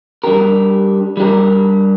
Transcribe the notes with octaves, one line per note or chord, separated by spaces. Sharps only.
G3 D4 G4 A#4
G3 D4 G4 A#4